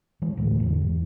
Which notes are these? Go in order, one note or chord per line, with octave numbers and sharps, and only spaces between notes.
E3 G#3
D2 A2 G#3 A3
E2 G#2 D3 E3
G#2